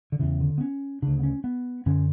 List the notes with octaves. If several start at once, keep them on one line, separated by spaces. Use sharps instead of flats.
D3
E2 C#3 E3
D3
B3
C#4
D2 C#3 D4
B3
C#4
B3
F#2 D3 C#4